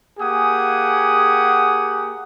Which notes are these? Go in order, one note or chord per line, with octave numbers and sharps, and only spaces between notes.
A#3 G4 G#4 F#5 G#5 D#6